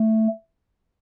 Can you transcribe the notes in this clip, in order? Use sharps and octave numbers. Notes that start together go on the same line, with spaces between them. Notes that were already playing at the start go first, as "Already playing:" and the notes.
Already playing: A3